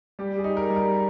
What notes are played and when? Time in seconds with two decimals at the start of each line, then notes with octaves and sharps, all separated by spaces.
0.19 G3 G4
0.38 G#4
0.44 D#4
0.57 A#4
0.70 G3
0.76 A#4